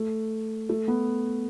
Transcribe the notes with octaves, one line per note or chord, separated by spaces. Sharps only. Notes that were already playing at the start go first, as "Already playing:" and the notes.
Already playing: A3
A3
B3